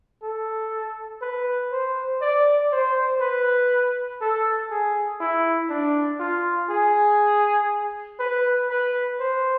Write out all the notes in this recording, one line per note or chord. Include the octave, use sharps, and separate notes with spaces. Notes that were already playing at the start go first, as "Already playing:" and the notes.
A4
B4
C5
D5
C5
B4
A4
G#4
E4
D4
F4
G#4
B4
B4
C5